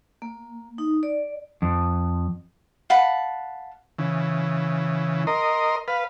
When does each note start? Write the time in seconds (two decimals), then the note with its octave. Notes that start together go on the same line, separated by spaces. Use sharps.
0.22 A#3
0.78 D#4
1.03 D5
1.62 F2
2.90 F5 F#5 A5 B5
3.99 C#3 E3
5.27 A#4 D#5 C6
5.88 B4 F5